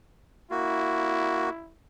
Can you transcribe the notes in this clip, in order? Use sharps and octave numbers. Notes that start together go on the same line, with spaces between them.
A#3 E4 F#4